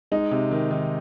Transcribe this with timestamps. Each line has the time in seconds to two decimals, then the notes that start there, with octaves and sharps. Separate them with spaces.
0.12 G#3 D#4
0.31 C3
0.51 D#3
0.71 D#3